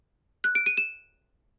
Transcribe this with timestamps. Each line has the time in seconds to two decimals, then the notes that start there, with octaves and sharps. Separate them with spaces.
0.44 F#6
0.55 D7
0.66 D#7
0.77 E7